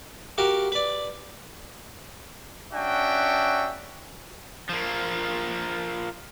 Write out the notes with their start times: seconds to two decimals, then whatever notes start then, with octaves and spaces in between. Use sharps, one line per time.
0.38 F#4 G4 A#4 F5
0.72 B4 D5
2.73 C#4 D4 F#4 E5 G5
4.70 F3 A#3